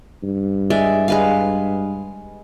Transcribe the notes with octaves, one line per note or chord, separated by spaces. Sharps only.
G2
G#3 D5 E5
G#3 B4 F5